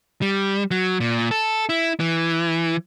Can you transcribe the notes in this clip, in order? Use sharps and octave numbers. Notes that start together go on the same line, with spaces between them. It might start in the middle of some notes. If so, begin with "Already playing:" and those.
G3
F#3
A#2
A4
E4
E3